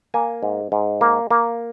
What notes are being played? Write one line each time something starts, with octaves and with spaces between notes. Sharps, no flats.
A#3 G#5
G#2
G#2
A#3
A#3